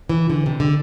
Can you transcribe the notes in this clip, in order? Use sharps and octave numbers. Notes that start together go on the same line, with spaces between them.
E3
D3
C3
D3